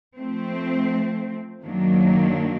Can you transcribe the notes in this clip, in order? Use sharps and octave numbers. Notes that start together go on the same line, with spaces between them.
F3 A3 C4
F#2 D#3 F#3 A#3 D4